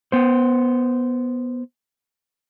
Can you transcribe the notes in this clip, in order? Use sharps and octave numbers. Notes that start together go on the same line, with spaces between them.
B3 C5